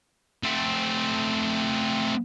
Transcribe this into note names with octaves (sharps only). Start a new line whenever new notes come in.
A3 C4